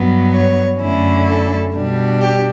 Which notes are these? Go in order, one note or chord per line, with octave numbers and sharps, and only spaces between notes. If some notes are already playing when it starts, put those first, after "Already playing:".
Already playing: G2 F#3 B3
C#5
F#2 D3 A3 C#4 E4
A4
B2 G3 D4
G4